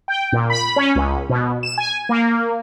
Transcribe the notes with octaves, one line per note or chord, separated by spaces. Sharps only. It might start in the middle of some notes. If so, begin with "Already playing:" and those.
G5
A#2
B5
C#4
C#2
B2
E7
G#5
A#3